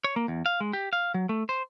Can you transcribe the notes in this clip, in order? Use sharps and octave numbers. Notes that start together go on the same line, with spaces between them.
C#5
A#3
E2
F5
G#3
G4
F5
F#3
A3
C5